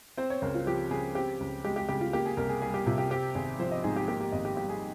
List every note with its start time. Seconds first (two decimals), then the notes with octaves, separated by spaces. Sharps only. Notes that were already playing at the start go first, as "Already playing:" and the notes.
0.17 C4 C5
0.30 C#5
0.42 C#2 A#4
0.55 F4
0.67 F3 G4
0.91 C#3 G#4
1.15 C4 G4
1.40 C#2
1.64 G#3 G4
1.76 G4
1.89 C#3 G4
2.01 F4
2.13 A#3 G4
2.26 G#4
2.37 C2 A#4
2.49 G#4
2.62 G3 G#4
2.74 G4
2.86 C3 F4
2.98 G4
3.10 C4 G4
3.35 G#1 G#4
3.59 F3 C5
3.71 D#5
3.84 G#2 G#4
3.96 G4
4.08 A#3 G4
4.21 G4
4.32 G#1 D#5
4.45 G4
4.57 G3 G4
4.69 G#4